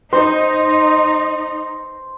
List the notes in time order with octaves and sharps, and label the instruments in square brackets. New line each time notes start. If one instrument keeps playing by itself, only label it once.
[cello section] D#4 [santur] C5